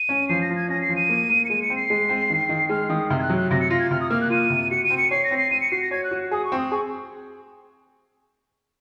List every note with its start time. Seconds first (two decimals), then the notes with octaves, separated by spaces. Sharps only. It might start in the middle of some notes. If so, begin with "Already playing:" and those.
Already playing: D#7
0.09 C#4
0.29 F3 C7
0.42 A#6
0.49 F3
0.56 G#6
0.68 C#4 A#6
0.82 C7
0.89 F3
0.96 D#7
1.09 A#3
1.30 A#3
1.45 C#7
1.49 G#3 D#7
1.62 C#7
1.70 C4
1.76 C7
1.90 G#3
2.09 C4
2.30 D#3
2.49 D#3
2.70 G#3 F6
2.89 D#3 D#6
3.10 C3 F6
3.19 G#6
3.23 F#6
3.30 F#3
3.37 F#6
3.51 C3 A#6
3.60 C#7
3.70 F4 A#6
3.80 G#6
3.91 C3 F6
4.01 D#6
4.10 A#3 F6
4.21 F#6
4.30 F4 D#7
4.50 C3
4.71 F#4 C#7
4.84 D#7
4.90 C4
4.97 C#7
5.11 C#5 C7
5.24 A#6
5.31 C4
5.37 C7
5.51 C4 D#7
5.61 C#7
5.72 F#4 C7
5.82 A#6
5.91 C#5 G#6
6.04 F#6
6.11 F#4
6.31 G#4 D#6
6.45 C#6
6.52 C4
6.58 D#6
6.72 G#4 C#6